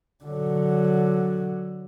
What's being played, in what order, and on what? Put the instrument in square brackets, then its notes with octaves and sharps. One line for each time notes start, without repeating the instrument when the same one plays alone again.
[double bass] D3 F#3